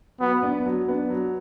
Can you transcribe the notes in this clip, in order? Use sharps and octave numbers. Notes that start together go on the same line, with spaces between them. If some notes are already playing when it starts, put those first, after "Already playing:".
F#3 B3
B3 D4
F#3
B3 D4
F#3